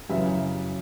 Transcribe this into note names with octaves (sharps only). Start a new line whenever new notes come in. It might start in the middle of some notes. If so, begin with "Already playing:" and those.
F#2 C#3 E3 E5